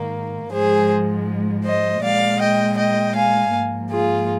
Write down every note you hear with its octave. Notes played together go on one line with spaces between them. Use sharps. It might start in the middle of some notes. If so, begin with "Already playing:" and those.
Already playing: G#2 D#3 A#3
G#2 F3 G#3 G#4 C5
C5 D#5
A#2 G#3 D5 F5
D#5 G5
D#5 G5
F5 G#5
G#2 F3 A#3
F4 G#4